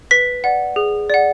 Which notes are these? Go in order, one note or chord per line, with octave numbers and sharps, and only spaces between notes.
B4 B6
D5 F#5
G#4
D5 F#5